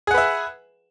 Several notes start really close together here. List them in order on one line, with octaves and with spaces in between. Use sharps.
G#4 F#5 B4 E5